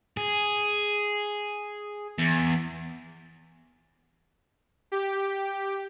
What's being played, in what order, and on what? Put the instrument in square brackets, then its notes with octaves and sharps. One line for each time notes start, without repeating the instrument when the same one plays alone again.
[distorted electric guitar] G#4
E2
[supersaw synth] G4